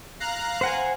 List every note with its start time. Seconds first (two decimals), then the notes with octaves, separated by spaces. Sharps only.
0.20 F5 A#5 F#6
0.61 C5 F#5 G#5